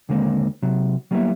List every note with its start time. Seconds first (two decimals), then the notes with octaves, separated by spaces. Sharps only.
0.09 D#2 D3 G#3 A#3 C4
0.62 C3 F#3
1.11 F#3 G3 A#3 B3 E4